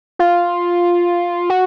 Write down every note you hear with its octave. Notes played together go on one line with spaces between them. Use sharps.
F4
F#4